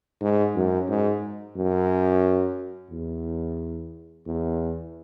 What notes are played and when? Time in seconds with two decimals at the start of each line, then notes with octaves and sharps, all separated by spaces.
0.21 G#2
0.56 F#2
0.89 G#2
1.56 F#2
2.91 E2
4.27 E2